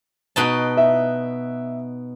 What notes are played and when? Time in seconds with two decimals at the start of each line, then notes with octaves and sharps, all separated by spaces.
0.36 B2 D#4 A5
0.77 E5